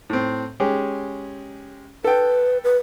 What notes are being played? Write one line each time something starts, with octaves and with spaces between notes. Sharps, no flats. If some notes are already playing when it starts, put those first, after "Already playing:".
A2 C4
G#3 C#4 G4
A4 B4 G5
B4